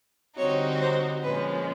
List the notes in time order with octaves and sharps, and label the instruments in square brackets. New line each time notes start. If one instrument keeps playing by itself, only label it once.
[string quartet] D3 G3 C4 D#4 F#4 [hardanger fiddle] C#5
[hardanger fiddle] C5
[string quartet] A#2 F3 G#3 C#4 [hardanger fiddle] B4